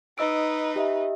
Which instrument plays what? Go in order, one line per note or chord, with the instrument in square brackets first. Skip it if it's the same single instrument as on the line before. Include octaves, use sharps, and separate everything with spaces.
[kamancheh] D#4 B4 [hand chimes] D#5 E6 D7
[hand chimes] G4 D#5 E5